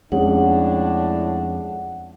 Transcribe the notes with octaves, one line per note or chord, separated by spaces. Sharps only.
F2 A2 G#3 C#4 D4 G#4 F#5